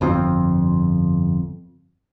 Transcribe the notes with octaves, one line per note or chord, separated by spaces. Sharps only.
G1 F2 F3 C4